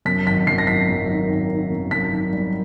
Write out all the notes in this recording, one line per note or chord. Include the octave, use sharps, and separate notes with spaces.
F#2 B6
G#1 B6
F#2 C7
A#6
G#1 B6
F#2
D#3
G#1
D#3
F#2
F#2 B6
D#3
G3